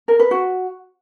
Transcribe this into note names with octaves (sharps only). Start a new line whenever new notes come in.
A#4
B4
F#4